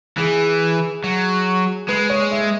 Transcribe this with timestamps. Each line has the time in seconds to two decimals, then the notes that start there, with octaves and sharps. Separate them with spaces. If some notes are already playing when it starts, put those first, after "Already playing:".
0.18 E3 G#4
1.04 F#3
1.89 G#3 B4
2.10 C#5
2.31 E5